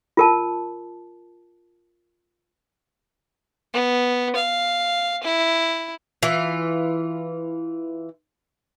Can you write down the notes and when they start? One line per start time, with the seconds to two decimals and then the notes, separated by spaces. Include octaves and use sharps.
0.17 F4 A#4 A5
3.74 B3
4.36 F5
5.24 E4
6.23 E3 F4